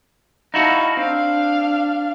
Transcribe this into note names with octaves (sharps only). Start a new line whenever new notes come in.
D#4 E4 F#4 F5 A5
C4 D4 F5